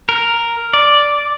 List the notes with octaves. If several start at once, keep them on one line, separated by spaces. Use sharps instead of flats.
A#4
D5